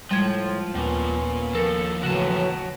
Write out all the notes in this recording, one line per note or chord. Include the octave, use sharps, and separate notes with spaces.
A2 F3 G3 G#3 G#6
D#2 A#2 B3 C#4
D#2 F3 A4 A#4
A2 C#3 E3 F#3 F#4 A5